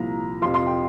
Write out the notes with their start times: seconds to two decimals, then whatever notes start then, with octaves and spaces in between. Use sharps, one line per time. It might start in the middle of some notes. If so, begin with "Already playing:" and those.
Already playing: C2 A#2 F3 A#5
0.42 F2 C3 F3 C6
0.54 C6
0.67 G5